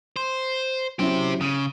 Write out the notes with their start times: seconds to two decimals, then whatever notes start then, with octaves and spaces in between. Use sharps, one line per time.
0.16 C5
0.99 F#3 C#4 E4 G4 C5
1.41 C#3 D#7